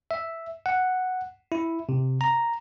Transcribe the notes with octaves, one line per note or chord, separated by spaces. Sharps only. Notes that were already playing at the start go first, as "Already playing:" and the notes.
E5
F#5
E4
C3
A#5